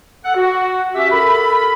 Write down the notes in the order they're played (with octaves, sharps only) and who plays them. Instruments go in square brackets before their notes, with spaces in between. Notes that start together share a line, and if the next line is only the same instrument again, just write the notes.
[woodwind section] A4 F#5
F#4
C#4 G4 E5
A4 A#4 B5